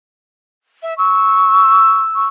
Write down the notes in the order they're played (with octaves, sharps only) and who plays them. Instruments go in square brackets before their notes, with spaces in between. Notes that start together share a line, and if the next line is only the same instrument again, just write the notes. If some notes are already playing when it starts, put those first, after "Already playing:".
[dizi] E5
[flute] C#6 [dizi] E6
[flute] C#6